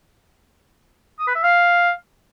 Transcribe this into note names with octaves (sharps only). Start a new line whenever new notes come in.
D#6
B4
E5
F5